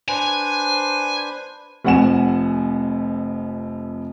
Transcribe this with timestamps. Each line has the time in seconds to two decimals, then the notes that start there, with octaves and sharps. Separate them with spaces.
0.09 D4 B4 C5 G#5
1.85 F1 F2 F#5 G#5 E7